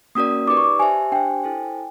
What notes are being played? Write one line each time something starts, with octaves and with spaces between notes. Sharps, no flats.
A#3 C#4 F#4 A#4 D5 D#6
D#4 G4 B4 D5 D6
C#6
D6
G4 C5 E5 G#5 A5
D4 G4 C5 G5
E4 A4 C5